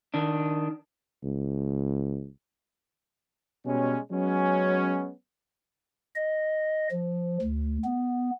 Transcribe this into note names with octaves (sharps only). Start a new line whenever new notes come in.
D#3 D4
C#2
B2 G3 G#3 C#4
F#3 G#3 B3 C#4
D#5
F3
D2
B3